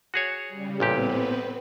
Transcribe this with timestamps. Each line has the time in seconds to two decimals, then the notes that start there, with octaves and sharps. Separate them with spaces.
0.14 F#4 G#4 C#5
0.48 C#3 G3
0.80 A1 A#2 B3 C4 G4 B4